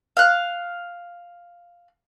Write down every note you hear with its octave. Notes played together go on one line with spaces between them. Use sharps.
F5 F#6